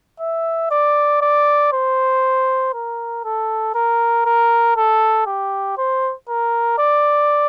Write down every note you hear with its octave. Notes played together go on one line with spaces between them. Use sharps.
E5
D5
D5
C5
A#4
A4
A#4
A#4
A4
G4
C5
A#4
D5